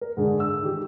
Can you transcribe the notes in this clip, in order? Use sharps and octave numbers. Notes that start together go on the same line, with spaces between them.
A#4
G#2 D3 G#4
E6
D#3 G4